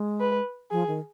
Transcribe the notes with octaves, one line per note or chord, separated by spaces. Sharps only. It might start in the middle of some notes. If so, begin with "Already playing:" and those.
Already playing: G#3
B4
F3 G#4
D#3